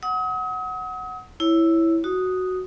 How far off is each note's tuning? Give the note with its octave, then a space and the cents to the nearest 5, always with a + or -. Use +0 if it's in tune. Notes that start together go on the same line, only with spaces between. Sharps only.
F#5 +0 D#6 +40
E4 +0 C#5 +0
F#4 +0 D#6 +0